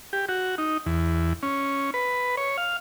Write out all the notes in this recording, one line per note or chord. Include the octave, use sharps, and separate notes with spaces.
G4
F#4
D#4
E2
C#4
B4
C#5
F5